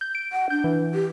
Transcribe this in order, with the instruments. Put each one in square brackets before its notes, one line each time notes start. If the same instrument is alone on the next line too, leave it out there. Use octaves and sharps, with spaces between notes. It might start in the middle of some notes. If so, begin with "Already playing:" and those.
[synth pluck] G6
D7
[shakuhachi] F#5
[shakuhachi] D4 [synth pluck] G6
[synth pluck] E3
[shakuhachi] G4